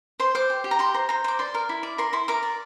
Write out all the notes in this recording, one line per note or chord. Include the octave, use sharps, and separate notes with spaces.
C5 C6
C5 D6
G4
G4
A#5
G4 C6
C5 A#5
C5 A#5
C5 D6
D5 C6
A#4
E4
D5
A#4 C6
E4 C6
A#4 D6
D5